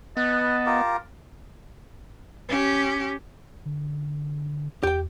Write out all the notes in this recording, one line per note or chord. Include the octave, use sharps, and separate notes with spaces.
B3 B4 D#5 A5
F4 G4 A#4
C#4 G4
D3
E2 G4 G5